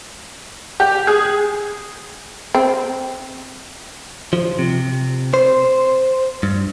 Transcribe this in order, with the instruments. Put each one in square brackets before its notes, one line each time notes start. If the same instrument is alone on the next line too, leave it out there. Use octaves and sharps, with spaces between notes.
[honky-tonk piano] G4
G#4
[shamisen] C4
[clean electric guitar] F3
C3
C5
G2